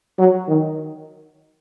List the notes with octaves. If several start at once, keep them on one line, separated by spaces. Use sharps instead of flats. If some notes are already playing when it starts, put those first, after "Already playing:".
F#3
D#3